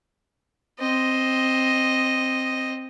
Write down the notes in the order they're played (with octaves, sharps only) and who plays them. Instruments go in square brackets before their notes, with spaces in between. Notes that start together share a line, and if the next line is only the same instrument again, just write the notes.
[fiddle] C4 D#5